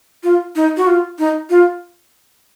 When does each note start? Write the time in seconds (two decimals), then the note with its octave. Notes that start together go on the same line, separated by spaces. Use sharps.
0.24 F4
0.56 D#4
0.77 F#4
0.87 F4
1.19 D#4
1.50 F4